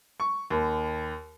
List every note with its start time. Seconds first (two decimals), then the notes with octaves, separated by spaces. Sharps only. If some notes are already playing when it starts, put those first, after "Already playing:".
0.20 C#6
0.50 D#2